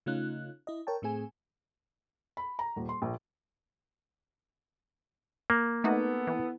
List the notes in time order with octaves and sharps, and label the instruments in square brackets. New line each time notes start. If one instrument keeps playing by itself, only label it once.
[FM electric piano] C#3 A3 C#4 D#4 F4 F#6
E4 D#5
A#4 C#5 G5 A5
A2 A3 C4 G#4 G#5
[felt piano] B5
A#5
D#1
C6
A#1
[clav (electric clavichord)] A#3
[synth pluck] A3 D#4 F#4 [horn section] B3 A4
[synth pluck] E3